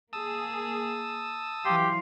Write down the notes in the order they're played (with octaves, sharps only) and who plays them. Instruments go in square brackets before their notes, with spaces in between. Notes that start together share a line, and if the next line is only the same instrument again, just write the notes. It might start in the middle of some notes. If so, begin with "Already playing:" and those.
[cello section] A#3 G#4 [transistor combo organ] A5 D#6 E6
[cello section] E3 F#3 F5 [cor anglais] G4 [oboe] C6